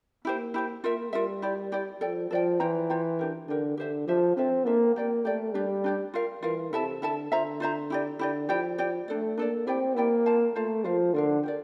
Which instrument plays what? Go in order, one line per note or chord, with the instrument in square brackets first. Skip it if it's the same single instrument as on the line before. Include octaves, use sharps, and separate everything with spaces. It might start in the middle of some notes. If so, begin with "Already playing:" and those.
[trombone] A#3 [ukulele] E4 G4 C5
[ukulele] E4 G4 C5
[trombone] A#3 [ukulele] F4 A#4 E5
[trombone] G3 [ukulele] F4 A#4 E5
[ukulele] E4 G4 D5
E4 G4 D5
[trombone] F3 [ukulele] A4 D5 G5
[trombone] F3 [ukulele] A4 D5 G5
[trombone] E3 [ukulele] F4 C5 G5 A#5
[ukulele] F4 C5 G5 A#5
D4 G4 A#4
[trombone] D3 [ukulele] D4 G4 A#4
[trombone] D3 [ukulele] G4 C5 E5
[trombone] F3 [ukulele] G4 C5 E5
[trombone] C4 [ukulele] D4 F4 A4 E5
[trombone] A#3 [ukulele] D4 F4 A4 E5
[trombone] A#3 [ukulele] G4 D5 G5
[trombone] A3 [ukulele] G4 D5 G5
[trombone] G3 [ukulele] D4 G4 D5
[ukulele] D4 G4 D5
F4 A#4 F5
[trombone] E3 [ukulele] F4 A#4 F5
[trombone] C3 [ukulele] E4 A4 E5 A5
[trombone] D3 [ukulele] E4 A4 E5 A5
[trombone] D3 [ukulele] F4 C5 E5 A#5
[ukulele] F4 C5 E5 A#5
E4 G4 D5
[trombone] D3 [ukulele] E4 G4 D5
[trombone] F3 [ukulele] E4 G4 D5 G5
[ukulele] E4 G4 D5 G5
[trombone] A3 [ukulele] D4 A4 D5
[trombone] A#3 [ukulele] D4 A4 D5
[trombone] C4 [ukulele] E4 G4 D5 G5
[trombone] A#3 [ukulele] E4 G4 D5 G5
[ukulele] F4 C5 F5 A5
[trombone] A3 [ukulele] F4 C5 F5 A5
[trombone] F3 [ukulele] F4 A#4 F5
[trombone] D3 [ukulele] F4 A#4 F5
[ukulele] G4 A#4 D5